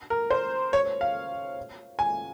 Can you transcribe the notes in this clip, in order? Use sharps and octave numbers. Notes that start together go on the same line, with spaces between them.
A#4
C5
C#5
F5
G#5